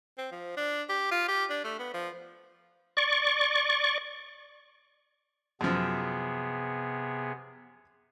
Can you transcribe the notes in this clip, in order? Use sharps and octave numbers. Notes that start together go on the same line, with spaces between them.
C4
F3
D4
G4
F4
G4
D4
A3
B3
F3
D5 C#6
F#2 C3 F3 B3 G#4